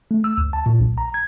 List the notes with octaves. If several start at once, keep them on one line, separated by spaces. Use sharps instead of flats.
A3
E6
D2
A5
A#2
B1
A#5
G#6